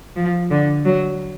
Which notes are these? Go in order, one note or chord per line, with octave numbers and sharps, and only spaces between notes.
F3
D3
F#3